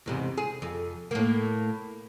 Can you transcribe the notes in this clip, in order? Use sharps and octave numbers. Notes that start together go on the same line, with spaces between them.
E2 G#2 C3
G#4
F2
A2 A#3